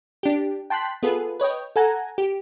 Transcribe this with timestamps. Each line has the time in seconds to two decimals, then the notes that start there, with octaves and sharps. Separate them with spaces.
0.23 D4 G4
0.70 G5 A5 C6 F#6 B6
1.03 B3 F4 G#4 A4 B4
1.40 B4 C#5 D#5 G5
1.76 A4 F#5 G#5 A#5
2.18 G4